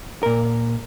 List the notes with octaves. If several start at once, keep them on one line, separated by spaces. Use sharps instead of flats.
A#2 A#4